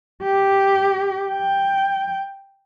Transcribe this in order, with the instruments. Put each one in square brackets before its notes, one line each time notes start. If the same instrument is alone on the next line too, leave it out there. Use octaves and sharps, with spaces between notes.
[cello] G4
G5